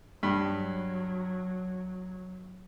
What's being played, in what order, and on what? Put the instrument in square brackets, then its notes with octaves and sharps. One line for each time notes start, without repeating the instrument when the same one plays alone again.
[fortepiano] G2 [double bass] F#3